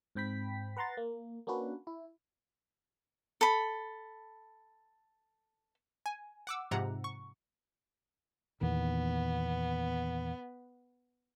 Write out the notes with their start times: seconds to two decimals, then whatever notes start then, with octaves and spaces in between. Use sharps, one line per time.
0.15 G#2 C4 G5 B5 B6
0.77 B4 F#5 A#5 C6 A6
0.97 A#3
1.47 A#3 C#4 D4 F#4 B4
1.87 E4
3.41 A4 B5
6.06 G#5
6.47 F#5 D6 E6
6.71 G#2 C3 F3 F#5 A#5
7.04 C#6
8.61 E2 A#2 D#3 B3